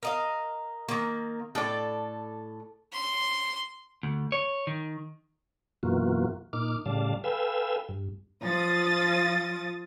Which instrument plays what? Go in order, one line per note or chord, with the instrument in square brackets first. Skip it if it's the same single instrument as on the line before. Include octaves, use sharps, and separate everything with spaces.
[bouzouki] A#4 D#5 F5
D#3 A#3
[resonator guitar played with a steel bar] A2 D5 [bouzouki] A4
[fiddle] C6
[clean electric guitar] D2
C#5
D#3
[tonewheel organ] F#2 B2 E3 A#3 F4 F#4
A#2 D#4 D6 F6
A2 C#3 G3 D5 F5 A5
A4 B4 F5 G5 G#5 E6
G2
[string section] F3 F4 D#6 A6